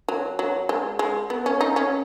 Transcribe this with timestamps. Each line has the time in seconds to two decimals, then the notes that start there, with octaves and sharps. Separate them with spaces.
0.08 F#3
0.39 F#3
0.69 G#3
0.99 G#3
1.30 B3
1.46 C#4
1.61 D#4
1.76 C#4